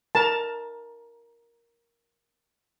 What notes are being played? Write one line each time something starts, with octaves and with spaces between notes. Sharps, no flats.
A#4 A5